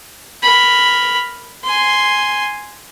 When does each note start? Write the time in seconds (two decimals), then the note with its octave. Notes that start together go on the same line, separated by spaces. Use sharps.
0.43 A#4 B5
1.63 G#5 C6